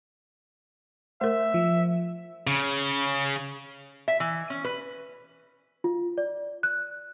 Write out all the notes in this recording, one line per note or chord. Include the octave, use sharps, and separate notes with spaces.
A3 A#4 C5 E5
F3
C#3
E5
E3
C#4
B4
F4
D5
F#6